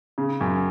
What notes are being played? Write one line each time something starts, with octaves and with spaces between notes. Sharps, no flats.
C#3
F#2